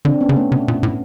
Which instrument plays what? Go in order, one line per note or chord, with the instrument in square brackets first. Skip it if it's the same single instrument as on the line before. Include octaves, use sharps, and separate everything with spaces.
[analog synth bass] D3 [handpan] C4 D4
[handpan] B3 C#4
[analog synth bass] C#3
[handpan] A3 B3
[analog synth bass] C3
A#2
A2